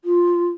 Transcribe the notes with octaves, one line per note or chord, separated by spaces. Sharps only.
F4